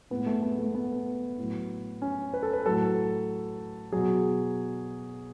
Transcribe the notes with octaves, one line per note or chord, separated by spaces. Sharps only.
A2 G#3 B3
A3
B3
A3
B3
A2 F#3
C#4
B4
A4
B4
A2 F#3 A4
B2 F#3 G#4